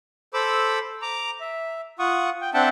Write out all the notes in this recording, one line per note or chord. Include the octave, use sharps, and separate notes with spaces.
A4 C5 B5 D6 E6
A#5 D6
E5
F4 F#5 C#6 D#6
G5
C4 D4 E5 F#5 G5 A5